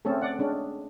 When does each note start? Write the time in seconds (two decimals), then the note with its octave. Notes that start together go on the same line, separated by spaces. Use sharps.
0.05 A3 C4 C#4 G#4 A4
0.22 D5 F#5
0.39 G#3 C#4 D4